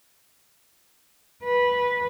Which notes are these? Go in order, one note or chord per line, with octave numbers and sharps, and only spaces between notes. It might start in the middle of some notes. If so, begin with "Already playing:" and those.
B4